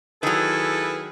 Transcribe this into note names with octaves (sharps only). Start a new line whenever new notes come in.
D#3 F#3 E4 G#4 A4 B4